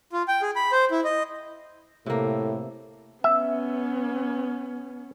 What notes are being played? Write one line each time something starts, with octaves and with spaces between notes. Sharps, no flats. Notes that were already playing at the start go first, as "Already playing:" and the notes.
F4
G5
G#4
B5
C5
E4
D#5
A2 C3 A#3 A4
B3 C#4 E5